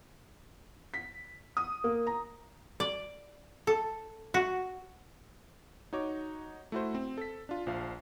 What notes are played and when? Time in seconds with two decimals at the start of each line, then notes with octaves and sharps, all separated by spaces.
0.94 B6
1.57 D#6
1.84 A#3
2.07 A#5
2.80 D5
3.67 A4
4.34 F#4
5.93 D#4 F#4 C#5 D6
6.72 A3 E4 F#4 C5
6.95 C4
7.18 A4 B6
7.49 D4 F4
7.67 A#1 F3 F5